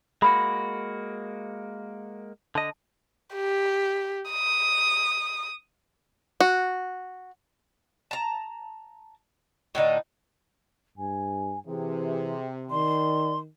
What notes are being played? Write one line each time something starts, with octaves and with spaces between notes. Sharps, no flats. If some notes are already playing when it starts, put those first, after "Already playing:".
G#3 A#3 F#4 B5
D3 D#5 A5
G4
D#6
F#4
A5 A#5
A2 D3 D#4 D5
G2 G#5
C3 E3 G#4
D#3 D5 C6